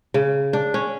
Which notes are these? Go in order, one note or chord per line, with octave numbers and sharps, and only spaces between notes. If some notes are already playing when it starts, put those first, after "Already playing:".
C#3
D4
C#4